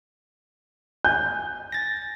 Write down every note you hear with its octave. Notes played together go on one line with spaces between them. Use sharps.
G#5 G6
A6 A#6